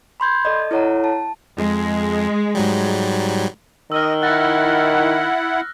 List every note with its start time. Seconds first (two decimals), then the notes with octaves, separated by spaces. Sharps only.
0.20 B5 C6 G6 G#6
0.45 A4 D5 D#5
0.71 E4 A4 C#5 F#5 A#5
1.04 A5
1.58 F2 G#3
2.55 G#2 F#3 G3
3.92 D#3 D#5 E6 F6
4.22 E4 F#5 F#6 A6 A#6